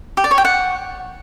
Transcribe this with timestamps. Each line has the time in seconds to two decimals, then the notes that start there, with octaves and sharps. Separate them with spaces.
0.17 G4
0.24 D5
0.31 C#5
0.38 G5
0.45 F#5